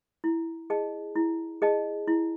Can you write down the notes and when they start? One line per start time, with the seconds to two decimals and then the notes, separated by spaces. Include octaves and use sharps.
0.24 E4
0.70 G#4 D#5 A5
1.16 E4
1.62 G#4 D#5 A5
2.08 E4